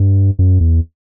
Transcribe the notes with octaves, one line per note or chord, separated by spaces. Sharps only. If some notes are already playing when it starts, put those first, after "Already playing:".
Already playing: G2
F#2
E2